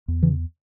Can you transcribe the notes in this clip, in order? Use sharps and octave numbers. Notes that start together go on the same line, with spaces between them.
E2
C#3 E3